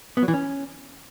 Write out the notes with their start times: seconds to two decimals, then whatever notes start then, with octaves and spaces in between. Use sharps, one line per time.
0.17 B3
0.23 F#3
0.28 E3
0.34 C#4